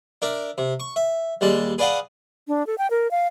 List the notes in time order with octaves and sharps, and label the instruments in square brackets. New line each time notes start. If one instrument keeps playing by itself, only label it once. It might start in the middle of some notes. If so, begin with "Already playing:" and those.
[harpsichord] D4 A#4 E5
C3
C#6
E5
D#2 G3 G#3 A5
G#4 B4 D5 D#5 F5 F#5
[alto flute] D4
A4
G5
A#4
F5